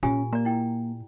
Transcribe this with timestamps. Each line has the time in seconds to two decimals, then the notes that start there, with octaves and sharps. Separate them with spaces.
0.03 A#2 C#4 F4 G4 G#5
0.33 A#3 D5 A#5
0.45 E4 G5